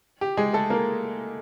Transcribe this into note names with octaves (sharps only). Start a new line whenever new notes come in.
G4
G#3 G#4
A3 A4
A#3 A#4